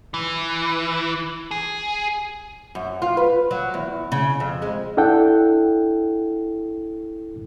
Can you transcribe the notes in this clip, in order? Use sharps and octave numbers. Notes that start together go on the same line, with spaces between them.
E3
G#4
F#2
F4
B4
F#3
E2
C#3
F2
G#3
D4 E4 A4 F#5 G5